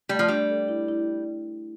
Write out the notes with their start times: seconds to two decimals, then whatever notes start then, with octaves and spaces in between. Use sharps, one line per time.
0.09 G3 A3
0.19 F3
0.28 G3 D4
0.49 A4
0.68 E4
0.88 E4